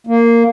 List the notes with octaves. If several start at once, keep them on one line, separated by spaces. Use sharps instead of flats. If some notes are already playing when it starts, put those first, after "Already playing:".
A#3